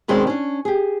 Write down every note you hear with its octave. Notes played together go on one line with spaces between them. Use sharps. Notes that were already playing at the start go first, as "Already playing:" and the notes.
B2 D#3 G#3 C4 C#4 D5
C#4 D4
G4 G#4